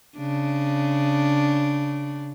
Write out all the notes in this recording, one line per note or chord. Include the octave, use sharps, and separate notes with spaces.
C#3 D4